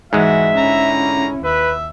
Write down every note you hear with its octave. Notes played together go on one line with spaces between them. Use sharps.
G#2 E3 G#3 F#4 E5
D3 C#4 E4 A#5
D#2 B4 E5